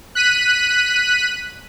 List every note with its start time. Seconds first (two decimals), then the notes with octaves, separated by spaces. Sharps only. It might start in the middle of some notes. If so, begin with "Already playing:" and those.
0.15 F#6 B6 D#7